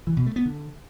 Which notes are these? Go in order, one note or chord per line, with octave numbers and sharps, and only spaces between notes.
E3
B2
A3
B3
D3